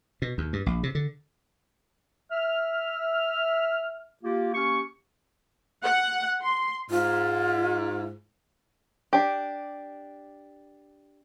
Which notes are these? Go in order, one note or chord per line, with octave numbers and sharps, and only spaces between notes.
B2
D#2
G2
A#1
C3
D3
E5 F6
A#3 F4 G4
A#3 C#4 G4 C#6
F#5
C6
G#2 F4
D4 G4